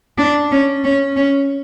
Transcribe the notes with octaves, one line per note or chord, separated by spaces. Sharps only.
D4
C#4
C#4
C#4